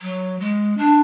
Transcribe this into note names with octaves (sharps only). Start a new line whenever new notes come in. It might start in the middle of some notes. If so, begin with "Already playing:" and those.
F#3
G#3
D4